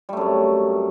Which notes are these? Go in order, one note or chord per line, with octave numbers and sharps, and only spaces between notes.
F#2 C3 G3 A3